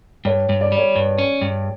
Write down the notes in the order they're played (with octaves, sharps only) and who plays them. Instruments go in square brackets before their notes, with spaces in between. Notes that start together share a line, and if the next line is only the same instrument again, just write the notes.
[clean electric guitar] G2 [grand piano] C#5
[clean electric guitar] G2
[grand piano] D5
[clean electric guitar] G3
[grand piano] C#5
[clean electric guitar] G2
C#4
G2